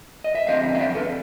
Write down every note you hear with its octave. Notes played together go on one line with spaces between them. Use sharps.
D#5
E5
F2 D3 G3 C4 D#5 F5
F5
D5 E5
A4 B4